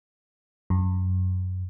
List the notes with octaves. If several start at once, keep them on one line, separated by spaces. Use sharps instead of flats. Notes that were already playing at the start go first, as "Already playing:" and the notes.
F#2